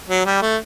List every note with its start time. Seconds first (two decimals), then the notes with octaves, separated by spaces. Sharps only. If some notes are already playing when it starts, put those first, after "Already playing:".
0.09 F#3
0.26 G3
0.42 A3